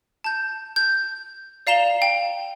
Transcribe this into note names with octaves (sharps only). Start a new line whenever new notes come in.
A5 G6
G6
D5 F5 A#5 E7 F7 G7
G5